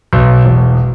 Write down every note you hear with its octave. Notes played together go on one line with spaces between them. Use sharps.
B1
E1